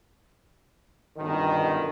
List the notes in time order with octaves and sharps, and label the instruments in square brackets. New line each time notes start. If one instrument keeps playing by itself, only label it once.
[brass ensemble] G1 F#2 B2 D#3